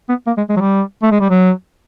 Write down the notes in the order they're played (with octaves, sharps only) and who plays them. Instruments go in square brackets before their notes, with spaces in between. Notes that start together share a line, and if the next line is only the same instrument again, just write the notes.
[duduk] B3
A#3
G#3
G#3
F#3
G3
A3
G#3
G3
F#3